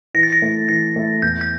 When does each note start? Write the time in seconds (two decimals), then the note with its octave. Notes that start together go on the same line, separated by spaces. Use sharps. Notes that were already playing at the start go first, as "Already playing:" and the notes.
0.14 E3 A#6
0.23 A6
0.32 A#6
0.42 A3 E4
0.69 E3 A6
0.96 A3 E4
1.22 E2 G6
1.41 G6